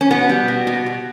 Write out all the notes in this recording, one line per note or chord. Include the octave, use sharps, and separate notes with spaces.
C#4
B2 B3
G3
B2
B2
B2